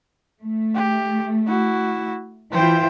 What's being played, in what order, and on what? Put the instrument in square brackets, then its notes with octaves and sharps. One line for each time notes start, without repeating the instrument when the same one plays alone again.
[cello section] A3
[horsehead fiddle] G4
E4 F#4
[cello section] E3 E4 F4 [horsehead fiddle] C5 G5